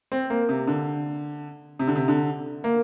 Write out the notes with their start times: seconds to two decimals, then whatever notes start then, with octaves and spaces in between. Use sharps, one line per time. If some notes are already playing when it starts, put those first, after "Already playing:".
0.12 C4
0.30 A#3
0.49 C3
0.68 D3
1.79 C3
1.88 D3
1.96 C3
2.08 D3
2.64 A#3